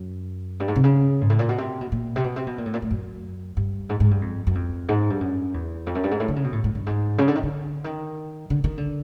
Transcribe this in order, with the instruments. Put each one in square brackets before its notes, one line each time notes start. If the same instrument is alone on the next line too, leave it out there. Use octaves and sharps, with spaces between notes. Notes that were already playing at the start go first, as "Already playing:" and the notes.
Already playing: [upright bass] F#2
G2
G#2
C3
C#3
G#2
A2
A#2
B2
C3
B2
A#2
C3
B2
C3
B2
A#2
A2
A#2
A2
F#2
G2
G#2
G#2
G2
F2
F#2
F2
G#2
G2
F#2
E2
F2
F#2
G2
G#2
A2
D3
C#3
B2
A2
G#2
G2
G#2
C#3
D3
D#3
D3
D#3
D3
D#3
D3